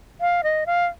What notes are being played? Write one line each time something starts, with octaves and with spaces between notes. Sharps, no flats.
F5
D#5
F5